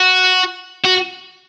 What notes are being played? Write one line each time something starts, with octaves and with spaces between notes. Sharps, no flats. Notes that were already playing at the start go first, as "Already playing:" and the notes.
Already playing: F#4
F#4